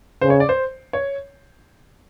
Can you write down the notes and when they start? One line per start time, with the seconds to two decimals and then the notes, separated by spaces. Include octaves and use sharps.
0.21 C#3 C5
0.30 C#5
0.40 D5
0.49 C5
0.93 C#5